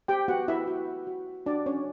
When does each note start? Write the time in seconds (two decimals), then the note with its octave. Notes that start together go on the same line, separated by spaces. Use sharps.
0.08 G4 G5
0.28 B3 F#4 F#5
0.48 E4 E5
0.67 F#4
1.07 F#4
1.46 D4 F#4 D5
1.66 C#4 C#5